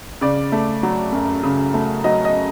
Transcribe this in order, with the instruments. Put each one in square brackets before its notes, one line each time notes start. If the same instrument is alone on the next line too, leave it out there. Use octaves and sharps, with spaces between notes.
[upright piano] C#3 D5
A3
F#3
F#2
C#3
A3
F#3 D#5
D#5